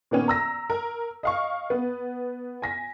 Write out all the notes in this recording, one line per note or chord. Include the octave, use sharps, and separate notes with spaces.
A#2 D#3 B3 C#4
A#5 E6 A#6
A#4
D#5 F5 C#6
B3
G#5 A#6 B6